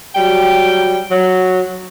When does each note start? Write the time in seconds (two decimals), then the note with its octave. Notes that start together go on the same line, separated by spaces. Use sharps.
0.15 F#3 G3 G5
1.11 F#3